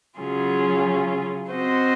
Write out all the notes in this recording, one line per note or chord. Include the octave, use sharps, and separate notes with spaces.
C#3 F#3 C#4 F4 G#4
C4 F#4 C5 D#5